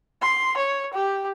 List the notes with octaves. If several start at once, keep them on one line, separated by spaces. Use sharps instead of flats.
C6
C#5
G4